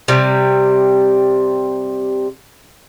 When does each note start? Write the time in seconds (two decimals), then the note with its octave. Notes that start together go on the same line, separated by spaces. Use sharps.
0.08 C3 G3